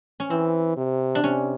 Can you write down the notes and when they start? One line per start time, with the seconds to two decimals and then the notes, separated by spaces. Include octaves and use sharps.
0.20 C#4
0.30 E3 C4
0.77 C3
1.15 D4
1.23 C3 C#4